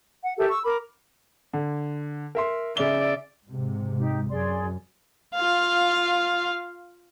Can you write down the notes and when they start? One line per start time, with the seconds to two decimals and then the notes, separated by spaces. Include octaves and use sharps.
0.23 F#5
0.38 G4 A4 A#4 E5
0.49 C#6 E6
0.64 A#4 B5 D6
1.53 D3
2.35 A#4 E5 C6
2.77 C#3 D5 E5 G7
3.47 G#2 C3
3.98 D#4 G4
4.30 F#2 G#4 D5 C6
5.35 F4 F5